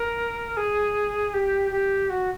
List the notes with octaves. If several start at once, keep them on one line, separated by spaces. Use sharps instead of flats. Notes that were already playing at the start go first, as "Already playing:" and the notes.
Already playing: A#4
G#4
G4
G4
F#4